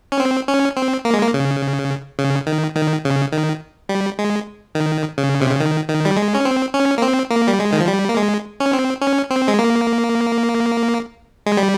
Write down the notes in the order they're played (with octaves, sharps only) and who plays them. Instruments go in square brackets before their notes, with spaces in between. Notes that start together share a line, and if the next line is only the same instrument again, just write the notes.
[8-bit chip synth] C#4
C4
C#4
C4
A#3
G#3
A#3
C#3
C#3
D#3
D#3
C#3
D#3
G3
G#3
D#3
C#3
C3
C#3
D#3
D#3
G3
G#3
C#4
C4
C#4
A#3
C4
A#3
G3
G#3
D#3
F3
G3
A#3
G#3
C#4
C4
C#4
C4
G#3
A#3
G#3
G3